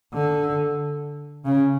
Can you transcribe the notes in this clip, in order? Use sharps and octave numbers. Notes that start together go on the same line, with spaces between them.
D3
C#3